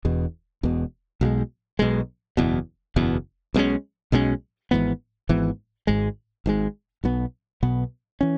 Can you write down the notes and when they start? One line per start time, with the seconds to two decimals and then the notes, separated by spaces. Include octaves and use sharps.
0.05 E1 E2 B2
0.63 E1 E2 B2
1.21 B1 B2 G#3
1.79 B1 B2 G#3
2.37 F#1 E2 B2
2.96 F#1 E2 B2
3.54 B1 B2 G#3 C#4
4.12 B1 B2 G#3 C#4
4.71 G#1 G#2 E3 B3
5.29 G#1 G#2 E3 B3
5.87 G#1 G#2 G#3
6.46 G#1 G#2 G#3
7.04 B1 B2 B3
7.63 B1 B2 B3
8.21 E3 C#4